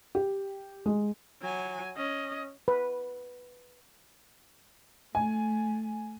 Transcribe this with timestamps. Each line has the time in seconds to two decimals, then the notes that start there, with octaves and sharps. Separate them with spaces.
0.15 G4
0.86 G#3
1.42 F#3 G#5
1.96 C#4 D#5
2.68 B4
5.15 A3 G#5